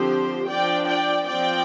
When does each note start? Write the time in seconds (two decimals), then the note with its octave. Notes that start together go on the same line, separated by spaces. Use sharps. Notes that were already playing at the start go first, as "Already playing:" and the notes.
Already playing: D3 F3 C4 G4 C5
0.48 F3 D4 D5 G5
0.88 D5 G5
1.27 F3 C4 D5 G5